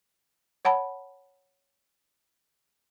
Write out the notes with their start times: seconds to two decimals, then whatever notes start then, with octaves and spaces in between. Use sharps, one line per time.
0.65 C#5 F#5 A5 B5